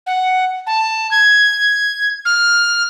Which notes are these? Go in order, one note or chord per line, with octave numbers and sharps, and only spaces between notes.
F#5
A5
G#6
F6